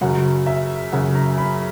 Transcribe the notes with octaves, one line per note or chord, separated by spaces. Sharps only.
F#2 C#3 F#3 F#5
E5
F#2 C#3 F#3 F#5
A#5
B5